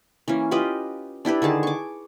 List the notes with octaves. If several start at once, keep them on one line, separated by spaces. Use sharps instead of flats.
E3 A#3 C#4
F4 G4 B4 D#5
D4 E4 G4 B4
D3 D#3 G#4 A5
C#6 D6